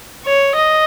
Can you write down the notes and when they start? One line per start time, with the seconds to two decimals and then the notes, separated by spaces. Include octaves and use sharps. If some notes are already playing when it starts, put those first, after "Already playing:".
0.25 C#5
0.55 D#5